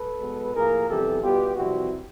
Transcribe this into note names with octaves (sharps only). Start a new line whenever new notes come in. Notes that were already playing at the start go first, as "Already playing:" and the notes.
Already playing: A4 B4
B2 G#3 B3
A2 F3 A#3 G#4 A#4
F2 C3 E3 G3 B3 G4 A4
B2 G3 B3 F4 G4
F2 C3 E3 G3 C4 E4 F#4